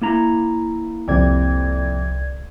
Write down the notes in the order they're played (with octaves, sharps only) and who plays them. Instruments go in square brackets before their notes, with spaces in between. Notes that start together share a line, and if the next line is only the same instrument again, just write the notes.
[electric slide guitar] A#3 E4 A#5
[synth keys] C2 D5 G#6 [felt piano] F2 C3